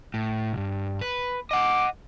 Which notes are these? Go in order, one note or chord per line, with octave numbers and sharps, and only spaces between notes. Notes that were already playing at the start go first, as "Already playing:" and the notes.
A2
C2 G2
B4 B5
D#5 F#5 D6